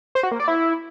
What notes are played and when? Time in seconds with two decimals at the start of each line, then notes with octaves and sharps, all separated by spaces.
0.15 C5
0.23 F#4
0.31 A#3
0.40 D5
0.48 E4